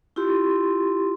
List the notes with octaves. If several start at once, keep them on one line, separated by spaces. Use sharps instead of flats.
E4 F4 G4 C6